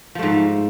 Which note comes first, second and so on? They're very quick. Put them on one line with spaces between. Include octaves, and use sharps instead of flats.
F3 A3 G#2